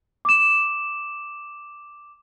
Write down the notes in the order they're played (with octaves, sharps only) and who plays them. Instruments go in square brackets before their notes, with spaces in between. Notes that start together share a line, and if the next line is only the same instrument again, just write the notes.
[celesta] D6 E7